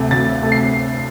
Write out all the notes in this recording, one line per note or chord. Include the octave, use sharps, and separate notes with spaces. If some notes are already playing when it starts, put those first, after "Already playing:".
Already playing: D2 C3 A3
D2 A6
C3 A3
C7